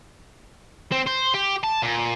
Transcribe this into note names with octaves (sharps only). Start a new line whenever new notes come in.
C4
C5
G4
A5
A#2